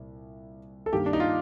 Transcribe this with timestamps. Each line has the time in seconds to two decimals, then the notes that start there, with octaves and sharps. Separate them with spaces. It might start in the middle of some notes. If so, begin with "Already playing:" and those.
Already playing: C2 A#2
0.86 A4
0.92 G2 D#3 A#3 G4
1.06 D4
1.13 D#4
1.20 F4